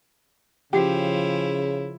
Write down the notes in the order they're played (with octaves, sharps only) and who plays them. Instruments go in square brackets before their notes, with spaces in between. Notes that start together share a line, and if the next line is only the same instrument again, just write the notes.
[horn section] C#3 [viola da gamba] F3 E4 [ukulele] G4